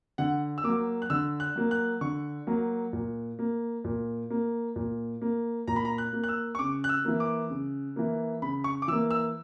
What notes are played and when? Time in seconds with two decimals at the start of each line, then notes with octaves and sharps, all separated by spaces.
0.18 D3 F#5
0.58 E6
0.64 F#3 A#3 D6
1.02 F#6
1.10 D3 E6
1.40 F#6
1.56 F#3 A#3
1.71 F#6
2.01 D3 C#6
2.47 F#3 A#3
2.93 A#2
3.39 A#3
3.84 A#2
4.31 A#3
4.76 A#2
5.22 A#3
5.68 A#2 A#5
5.76 B5
5.85 A#5
5.98 F#6
6.13 A#3
6.24 F#6
6.29 E6
6.55 C#6
6.59 C#3 D6
6.84 F#6
6.89 E6
7.05 E3 A#3
7.20 D6
7.50 C#3
7.96 E3 A#3
8.42 C#3 B5
8.64 C#6
8.82 D6
8.88 E3 E6
8.92 A#3
9.11 E6